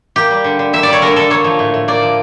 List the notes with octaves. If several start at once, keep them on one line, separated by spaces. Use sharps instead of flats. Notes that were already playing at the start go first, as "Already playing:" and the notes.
A#3 G4
G3
D3
D3
A#3 E5
G3 D5
C#5
D3 A#4
D3 A4
A#3 C#5
F3
A2
A2
A#3 D5
F3